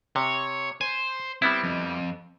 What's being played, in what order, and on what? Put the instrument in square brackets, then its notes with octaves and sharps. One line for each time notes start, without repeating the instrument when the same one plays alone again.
[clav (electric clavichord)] C3 [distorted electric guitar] C#5
[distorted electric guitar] C5 [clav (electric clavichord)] G#5
[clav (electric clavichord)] G3 B3 E4 [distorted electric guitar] C4
[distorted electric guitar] F2